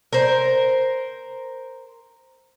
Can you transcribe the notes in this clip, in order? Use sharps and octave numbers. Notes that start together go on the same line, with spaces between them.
A#4 C5